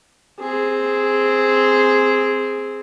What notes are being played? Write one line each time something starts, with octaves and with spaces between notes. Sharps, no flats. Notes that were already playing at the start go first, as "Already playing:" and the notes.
C4 G#4